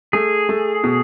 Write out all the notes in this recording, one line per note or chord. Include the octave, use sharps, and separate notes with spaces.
A3 G#4
A3
B2